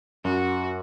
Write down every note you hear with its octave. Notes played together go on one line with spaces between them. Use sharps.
F#2 F#4